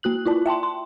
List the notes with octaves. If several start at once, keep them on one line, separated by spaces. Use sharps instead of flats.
A#3 F#4 F#6 F#7
E4 F4 D5 A5
E5 G5 A5 C6
C6